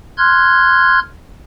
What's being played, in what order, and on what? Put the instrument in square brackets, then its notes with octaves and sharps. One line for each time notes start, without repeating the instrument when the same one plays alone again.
[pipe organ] C6 F6 F#6 G#6